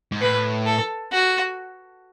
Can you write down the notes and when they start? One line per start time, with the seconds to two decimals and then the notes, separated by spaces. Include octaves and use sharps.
0.12 G#2
0.21 A2 B4
0.66 A4
1.12 F#4